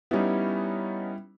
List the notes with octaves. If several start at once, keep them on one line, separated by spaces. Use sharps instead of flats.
G3 B3 C#4 D#4 E4